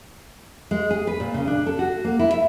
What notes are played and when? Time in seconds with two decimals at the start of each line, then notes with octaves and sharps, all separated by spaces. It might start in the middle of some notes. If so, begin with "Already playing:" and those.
0.71 G#3
0.91 G#4
1.07 B4
1.20 A#2
1.34 C#3
1.47 D4
1.66 A4
1.79 F#4
2.05 A#3
2.19 E4
2.34 E5